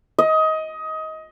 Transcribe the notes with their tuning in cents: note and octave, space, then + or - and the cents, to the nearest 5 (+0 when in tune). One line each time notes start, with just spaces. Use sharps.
D#5 +20